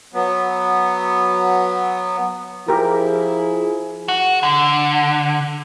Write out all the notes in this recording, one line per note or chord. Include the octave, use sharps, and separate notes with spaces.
F#3 B3
F3 E4 G4 G#4 A#4
F#4
D3